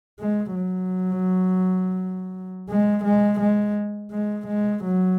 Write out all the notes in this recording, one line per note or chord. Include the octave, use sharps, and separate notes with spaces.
G#3
F#3
G#3
G#3
G#3
G#3
G#3
F#3